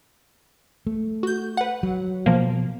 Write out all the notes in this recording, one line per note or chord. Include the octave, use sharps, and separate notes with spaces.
A3
F#4 G6
B4 F#5
F#3
B2 F3 A#3